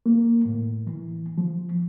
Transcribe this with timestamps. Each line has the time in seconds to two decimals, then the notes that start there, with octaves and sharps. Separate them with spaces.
0.06 A#3
0.45 A2
0.87 E3
1.38 F3